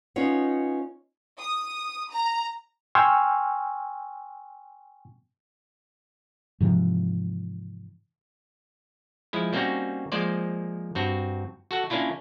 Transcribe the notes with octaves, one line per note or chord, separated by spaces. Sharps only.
B3 C#4 D#4 F4 C#5
D#6
A#5
G5 G#5 C6 C#6 E6 F6
G#2 C3 E3 F3
F3 G#3 E4
G3 A#3 C4 C#4 D#4 F#4
F3 G#3 A#3 C5 D5
G2 C4 F#4
F#4 A4 F#5
A#3 C#4 D4 E4 F4